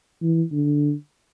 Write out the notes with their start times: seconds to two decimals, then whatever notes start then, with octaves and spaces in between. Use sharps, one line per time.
0.22 E3
0.52 D3